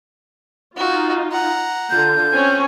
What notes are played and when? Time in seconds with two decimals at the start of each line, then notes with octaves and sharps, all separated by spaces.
0.77 D#4 F4 F#4
1.32 F#5 A#5
1.90 D3 F4 G6
2.32 C4 C#4 C#5 G#5